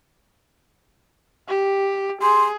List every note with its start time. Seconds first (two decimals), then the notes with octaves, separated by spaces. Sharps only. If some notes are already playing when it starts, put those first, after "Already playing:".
1.48 G4
2.22 G#4 C6